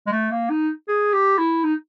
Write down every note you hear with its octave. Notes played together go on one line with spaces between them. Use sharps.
G#3
A3
A#3
D#4
G#4
G4
E4
D#4